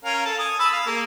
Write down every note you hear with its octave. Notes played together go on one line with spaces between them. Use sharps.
C#4 A#4 F5
A4 A5
G#5 D#6
A5 B5 E6
F5
A#3 G#4